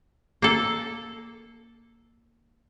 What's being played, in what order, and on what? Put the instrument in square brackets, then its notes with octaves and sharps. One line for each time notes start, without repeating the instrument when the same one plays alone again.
[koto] A#3 A4